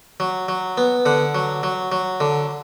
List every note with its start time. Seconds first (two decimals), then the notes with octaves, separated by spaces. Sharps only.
0.20 F#3
0.49 F#3
0.77 B3
1.06 D3 F#5
1.35 F#3
1.63 F#3
1.92 F#3
2.20 D3